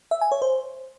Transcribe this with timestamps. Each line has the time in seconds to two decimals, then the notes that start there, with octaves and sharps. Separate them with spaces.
0.11 E5
0.21 G#5
0.32 C#5
0.42 C5